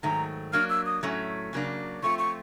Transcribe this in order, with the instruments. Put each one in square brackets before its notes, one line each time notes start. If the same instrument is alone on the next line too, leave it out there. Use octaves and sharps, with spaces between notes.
[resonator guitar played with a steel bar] G#2 D#3 F#3 A3 [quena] A#5
[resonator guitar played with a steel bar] F#3 A#3 D4 [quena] F6
[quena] E6
D#6
[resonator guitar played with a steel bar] A2 F#3 A3 C#4
C#3 F#3 A#3 D4
[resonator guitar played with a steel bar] F3 A3 C4 F4 [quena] C#6
[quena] C#6